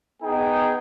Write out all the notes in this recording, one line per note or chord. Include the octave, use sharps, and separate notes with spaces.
B3 D#4 G#4 G5